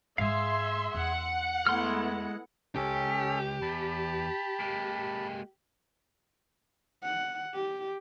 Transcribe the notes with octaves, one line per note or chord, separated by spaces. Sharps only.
G#2 G#3 G#4 E5 F5 C6
E2 F#5
G#3 A3 B3 E4 C6 F6
C#2 C#4 G4 A4
E2 A5 B5
G#3 A#3
F#5
G4